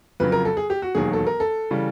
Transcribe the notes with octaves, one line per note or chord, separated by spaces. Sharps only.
F2 C#3 F#3 B4
A#4
A4
G#4
G4
F#4
E1 D#2 D#3 F#3 G#4
A4
A#4
A4
C#3 E3 G3